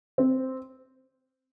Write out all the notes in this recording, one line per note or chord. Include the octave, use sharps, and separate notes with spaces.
C4